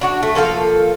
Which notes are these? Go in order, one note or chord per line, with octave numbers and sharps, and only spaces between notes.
D4 F#4 D5
A3
F3 A#3 A4 F5